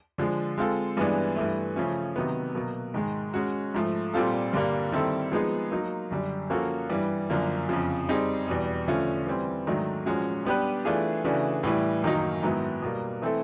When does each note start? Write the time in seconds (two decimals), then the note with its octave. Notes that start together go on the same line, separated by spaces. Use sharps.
0.18 D3 F3 G#3
0.58 G#3 C4 F4 A4
0.97 G2 E3 G#3 B3 D4
1.36 G2 E3 A3
1.76 C#3 F3 A3 C#4
2.16 C3 D#3 F#3 B3
2.55 B2 F#3 A#3
2.94 G#2 D#3 G#3
3.34 G#3 C#4 F#4
3.74 G#2 F3 A3
4.14 A#2 G3 C4 F4 A4
4.53 G2 D3 G3 A#3
4.92 D#3 G3 C4 E4 A4
5.32 F3 G#3 B3 D#4 G#4
5.72 F#3 A#3 D#4
6.11 F#2 D3 G3
6.50 F3 A#3 C#4 F#4 A4
6.89 G2 E3 G3
7.30 F#2 D3 F3 A#3
7.69 F2 C#3 F3
8.09 G3 C4 D#4 G#4
8.48 E2 B2 G3
8.88 D3 F3 A3 C#4 F4
9.27 E3 G3 C4
9.67 G#2 D#3 F#3 A3 D4
10.06 A#2 F3 G#3 C#4 F#4
10.45 G3 B3 D4 G4 B4
10.85 E3 A3 D4 F4 G#4
11.24 C#3 E3 A3 D4 F#4
11.63 A2 E3 G3
12.03 F#2 D#3 F#3 A#3 D#4
12.43 G#2 D#3 F#3 B3 E4
12.82 B2 G3 A#3
13.22 E3 A3 C4 E4 A4